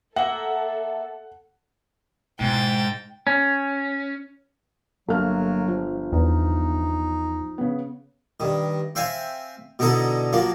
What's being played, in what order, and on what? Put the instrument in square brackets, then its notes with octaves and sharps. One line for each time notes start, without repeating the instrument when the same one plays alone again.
[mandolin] A#3 E5 [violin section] A4 [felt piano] F#5
[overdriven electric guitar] G#2 [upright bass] B2 E4 [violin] G5 A6
[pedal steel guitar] C#4
[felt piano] G1 F6 [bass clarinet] F#3 [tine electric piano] A#3 [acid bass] A4
[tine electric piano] F3
[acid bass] E2 [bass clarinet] D#4
[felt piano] C#3 B3
[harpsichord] G2 D#3
C4 C5 E5 F5 G#5
B2 D3 D#4 E4 A4 A#5
F3 F#3 A#3 F4